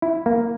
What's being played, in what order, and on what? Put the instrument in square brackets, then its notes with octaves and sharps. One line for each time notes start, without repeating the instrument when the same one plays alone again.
[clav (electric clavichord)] E4
A#3